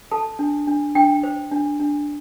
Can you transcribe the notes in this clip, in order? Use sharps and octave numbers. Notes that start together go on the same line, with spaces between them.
A4 A5
D4
D4
D4 G5
C5
D4
D4